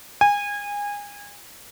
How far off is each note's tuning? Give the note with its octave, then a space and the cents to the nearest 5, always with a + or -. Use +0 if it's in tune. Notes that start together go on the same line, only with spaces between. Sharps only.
G#5 -25